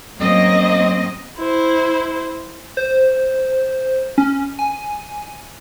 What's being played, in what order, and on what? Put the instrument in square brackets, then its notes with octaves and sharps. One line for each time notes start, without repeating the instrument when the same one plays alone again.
[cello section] F#3 A#3 C4 C#4 D#5
[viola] E4 C5
[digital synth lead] C5
C#4
G#5